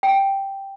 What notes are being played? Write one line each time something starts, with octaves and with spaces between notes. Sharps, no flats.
G5